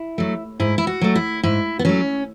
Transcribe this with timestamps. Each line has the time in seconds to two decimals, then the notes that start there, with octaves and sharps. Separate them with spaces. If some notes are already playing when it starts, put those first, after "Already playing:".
Already playing: E4
0.18 F#3 A3
0.60 G#2 E4
0.78 E4
0.87 F#4
1.01 F#3 A3
1.15 E4
1.43 G#2 E4
1.79 B3
1.85 F#3 A3 C#4